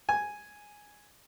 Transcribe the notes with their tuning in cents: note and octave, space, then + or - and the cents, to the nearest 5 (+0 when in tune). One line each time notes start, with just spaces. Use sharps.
G#5 +0